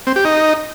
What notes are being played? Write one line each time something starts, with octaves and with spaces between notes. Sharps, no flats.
C4
G4
D#4